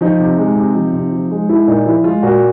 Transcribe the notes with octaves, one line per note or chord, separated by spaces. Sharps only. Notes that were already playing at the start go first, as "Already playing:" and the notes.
F3 D#4
C3
G#3
C3
F3
C3
F3
G#3
G#3 E4
A#2 D#4
F3 E4
G#3 F4
A#2 F#4